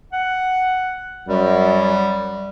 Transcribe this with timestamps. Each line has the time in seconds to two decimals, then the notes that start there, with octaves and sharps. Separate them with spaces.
0.13 F#5
1.28 F#2 G3